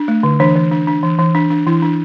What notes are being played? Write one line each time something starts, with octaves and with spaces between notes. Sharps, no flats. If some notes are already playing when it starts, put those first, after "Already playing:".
Already playing: D4
A3
D3
E3 D4
E3
D4
D4
E3
E3
D4
D4
E3 E4
D4